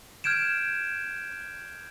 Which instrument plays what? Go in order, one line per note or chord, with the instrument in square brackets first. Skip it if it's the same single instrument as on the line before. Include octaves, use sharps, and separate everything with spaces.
[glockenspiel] F6 G6 G#6 D7 E7